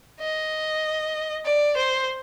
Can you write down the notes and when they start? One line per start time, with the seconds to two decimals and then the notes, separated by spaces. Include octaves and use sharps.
0.20 D#5
1.45 D5
1.77 C5